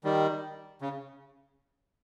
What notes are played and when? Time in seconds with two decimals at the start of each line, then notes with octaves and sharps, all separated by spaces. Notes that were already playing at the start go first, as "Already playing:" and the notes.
0.04 D#3 G3
0.81 C#3